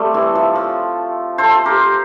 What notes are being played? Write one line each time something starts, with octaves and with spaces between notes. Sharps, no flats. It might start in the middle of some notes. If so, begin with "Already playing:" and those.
Already playing: G3 A3 C4
E3
F3
F3
A4 C5
A4
G4 A#4